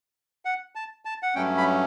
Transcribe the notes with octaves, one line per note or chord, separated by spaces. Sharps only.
F#5
A5
A5
F#5
G2 F#3 A3 C#4 G5
B5